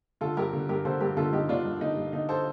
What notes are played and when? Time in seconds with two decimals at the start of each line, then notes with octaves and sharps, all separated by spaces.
0.21 D3 F4 A4
0.37 G2 G4 A#4
0.53 D3
0.69 G2 G4 A#4
0.85 D3 A4 C5
1.00 G2 G4 A#4
1.17 D3 F4 A4
1.33 G2 D#4 G4
1.49 D3 D4 F4
1.65 G2
1.81 D3 D#4
1.97 G2
2.13 D3 D#4
2.29 A4 C5